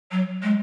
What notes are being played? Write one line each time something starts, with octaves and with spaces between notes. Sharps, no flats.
F#3
G#3